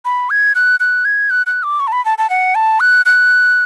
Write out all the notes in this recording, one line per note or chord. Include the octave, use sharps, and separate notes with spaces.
B5
G#6
F#6
F#6
G#6
F#6
F#6
D6
C#6
A5
B5
A5
A5
F#5
A5
F#6
F#6